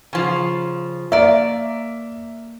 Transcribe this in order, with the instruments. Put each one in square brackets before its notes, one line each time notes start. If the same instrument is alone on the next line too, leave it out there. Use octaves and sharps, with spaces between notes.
[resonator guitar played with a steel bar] C#3 F3
[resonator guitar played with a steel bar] A#3 D5 [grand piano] E5